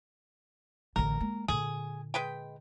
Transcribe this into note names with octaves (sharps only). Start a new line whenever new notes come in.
A1 D3 A#4
G#3 A#3
A#2 D3 G#4
G#3 B4 G5